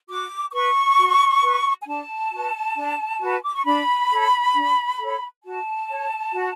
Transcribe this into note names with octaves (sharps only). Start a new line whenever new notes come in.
F#4 D6
D6
B4 C#6
F#4
B4
G#5
D4 A5
F#4 B4
D4
F#4 B4
D6
C#6
D4 B5
A4 C#5
D4
A4 C#5
F#4 A5
C#5
F#4